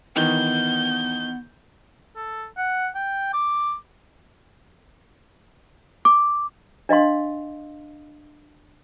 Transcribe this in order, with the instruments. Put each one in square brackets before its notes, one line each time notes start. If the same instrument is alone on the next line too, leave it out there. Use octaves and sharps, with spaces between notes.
[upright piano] D#3 E3 D#4 [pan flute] B3 [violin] G6
[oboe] A4
F#5
G5
D6
[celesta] D6
[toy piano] D4 D#5 F5 C6